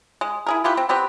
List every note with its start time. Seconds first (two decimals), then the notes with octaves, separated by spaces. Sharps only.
0.21 G#3
0.47 E4 G#4 A#4
0.64 E4 F4 G4 B4
0.77 C4
0.89 B3 C4 G4 B4